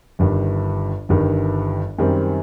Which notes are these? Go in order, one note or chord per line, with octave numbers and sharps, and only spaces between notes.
G1 G2 D#3
G1 G2 D#3
F#2 D#3 G3 C4